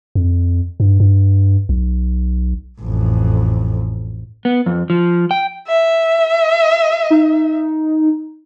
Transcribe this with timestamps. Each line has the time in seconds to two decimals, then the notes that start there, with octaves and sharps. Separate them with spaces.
0.15 F2
0.80 G2
1.00 G2
1.69 B1
2.81 A1 F2
4.45 B3
4.66 F2
4.90 F3
5.31 G5
5.68 E5
7.10 D#4